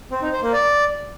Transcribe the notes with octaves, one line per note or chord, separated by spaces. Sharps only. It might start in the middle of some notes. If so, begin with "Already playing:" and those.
C4
D#4
C5
A#3
D5